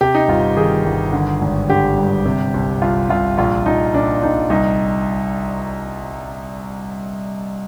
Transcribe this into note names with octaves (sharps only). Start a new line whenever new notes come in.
C3 G4
D#4
G1 F4
D#3 G#4
G1
D3
G#1
D3 G4
G2
C3
C2
C2 F4
C2 F4
A#1 F4
A#1 D#4
A#2 D4
A#1 D#4
C2 D#4